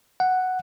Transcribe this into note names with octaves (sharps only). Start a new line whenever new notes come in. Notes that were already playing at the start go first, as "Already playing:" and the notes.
F#5